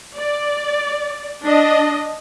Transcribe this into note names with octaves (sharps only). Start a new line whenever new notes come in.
D5
D4 D#5